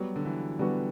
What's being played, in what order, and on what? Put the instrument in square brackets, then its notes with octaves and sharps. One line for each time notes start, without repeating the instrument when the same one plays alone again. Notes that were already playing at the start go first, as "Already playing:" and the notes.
Already playing: [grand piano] F#3 [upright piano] G3 B3 F#4
[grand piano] D3
E3
[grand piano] D3 [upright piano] G3 B3 F#4